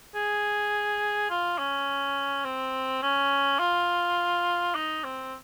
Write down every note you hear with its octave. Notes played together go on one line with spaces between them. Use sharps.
G#4
F4
C#4
C4
C#4
F4
D#4
C4